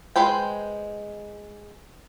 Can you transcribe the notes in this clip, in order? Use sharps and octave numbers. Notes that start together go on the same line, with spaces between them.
G#3 B4 C5 G5